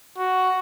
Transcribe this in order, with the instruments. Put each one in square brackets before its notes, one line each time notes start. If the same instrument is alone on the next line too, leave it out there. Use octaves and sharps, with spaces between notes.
[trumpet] F#4